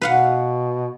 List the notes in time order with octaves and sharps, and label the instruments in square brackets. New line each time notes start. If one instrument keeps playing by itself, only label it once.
[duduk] B2 [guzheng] B4 F5 F#5